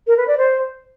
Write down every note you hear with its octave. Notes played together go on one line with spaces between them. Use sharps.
A#4
B4
D5
C5